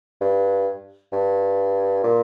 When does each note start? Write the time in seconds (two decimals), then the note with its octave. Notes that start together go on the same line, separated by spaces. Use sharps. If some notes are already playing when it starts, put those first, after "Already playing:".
0.21 G2
1.12 G2
2.03 A#2